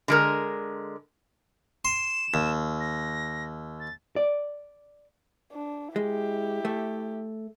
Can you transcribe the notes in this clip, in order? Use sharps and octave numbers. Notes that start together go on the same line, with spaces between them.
D3 G#3 A#4
C6 E7
D#2
A#6
A6
D5
D4
G#3 E4 G4
A3